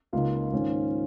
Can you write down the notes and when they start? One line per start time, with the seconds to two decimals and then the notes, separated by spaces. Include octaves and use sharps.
0.13 C#2 C#3 A#3 D#4 F4
0.53 G#2 D#3 A#3 C#4